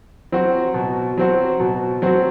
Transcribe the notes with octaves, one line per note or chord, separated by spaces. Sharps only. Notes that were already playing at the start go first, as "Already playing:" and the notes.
F#3 C4 F#4
B2
F#3 C4 F#4
B2
F#3 C4 F#4